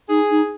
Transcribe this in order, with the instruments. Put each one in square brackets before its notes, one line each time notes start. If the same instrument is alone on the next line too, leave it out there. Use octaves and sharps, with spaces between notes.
[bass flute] D#4 [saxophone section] G#4
[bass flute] D#4